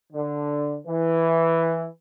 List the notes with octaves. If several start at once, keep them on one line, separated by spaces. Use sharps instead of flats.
D3
E3